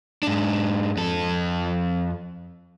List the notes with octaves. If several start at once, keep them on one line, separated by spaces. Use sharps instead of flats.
G#2 D4
F2 A4